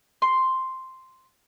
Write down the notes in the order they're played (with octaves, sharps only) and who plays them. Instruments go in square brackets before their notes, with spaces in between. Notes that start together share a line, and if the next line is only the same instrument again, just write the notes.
[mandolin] C6